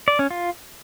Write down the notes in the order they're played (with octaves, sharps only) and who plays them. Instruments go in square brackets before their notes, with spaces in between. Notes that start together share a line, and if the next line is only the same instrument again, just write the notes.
[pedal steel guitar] D5
C#4
F4